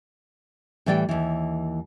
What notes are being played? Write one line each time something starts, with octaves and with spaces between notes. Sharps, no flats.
A2 E3 G3 D5 G5
D#2 E3